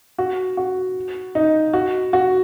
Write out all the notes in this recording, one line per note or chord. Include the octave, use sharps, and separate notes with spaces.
F#4
F#4
D#4
F#4
F#4